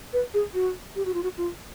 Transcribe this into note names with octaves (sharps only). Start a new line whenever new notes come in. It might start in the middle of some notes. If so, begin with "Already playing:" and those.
B4
G#4
F#4
G4
F#4
F4
F#4
F4